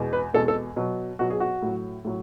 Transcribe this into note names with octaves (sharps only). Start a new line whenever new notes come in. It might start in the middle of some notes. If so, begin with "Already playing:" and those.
Already playing: E2 B2 G#3
B4
E2 B2 G#3 A4
A4
B2 F#3
B2 F#3 F#4
G#4
F#4
A2 F#3
A2 F#3